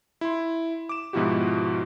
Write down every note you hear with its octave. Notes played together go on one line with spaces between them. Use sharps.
E4 C6
D6 E7
G#2 B2 F3 E4 F#4 G4